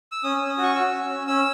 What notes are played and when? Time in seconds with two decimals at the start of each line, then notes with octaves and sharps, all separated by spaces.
0.12 E6
0.23 C#4 D#6
0.36 C#4 E6
0.49 D#6
0.58 F#4
0.63 C#6
0.75 F#4 E6
0.93 C#4
1.10 C#4
1.27 C#4 E6